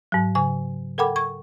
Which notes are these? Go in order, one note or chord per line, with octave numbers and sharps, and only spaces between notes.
G#2 F#3
C#3 G#5
A4 A#4 F#5 G5 B5 D6
C#6 G#6